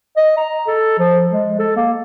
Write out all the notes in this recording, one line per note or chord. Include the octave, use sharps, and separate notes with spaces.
D#5
A#5
A4
F3
G#3
A4
A#3